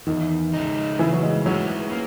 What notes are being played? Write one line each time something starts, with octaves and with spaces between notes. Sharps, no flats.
E2 D#3
C#3 G#3 D#4
C#3 E3
F#3
G#3
F#3 G#3 C#4
A#3